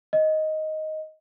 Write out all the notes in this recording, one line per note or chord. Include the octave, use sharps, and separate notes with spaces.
D#5